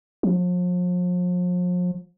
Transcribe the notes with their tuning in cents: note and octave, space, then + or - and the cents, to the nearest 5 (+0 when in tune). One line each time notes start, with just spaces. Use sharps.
F3 +40